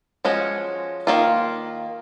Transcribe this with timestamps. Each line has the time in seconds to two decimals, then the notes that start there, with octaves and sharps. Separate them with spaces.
0.25 F3 G#3 C#4 F#4
1.07 D#3 A#3 F4